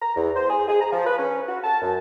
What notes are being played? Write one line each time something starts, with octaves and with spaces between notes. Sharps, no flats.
A#5
E2
C5
G#4
G#4
A#5
F3
B4
C#4
F#4
A5
F#2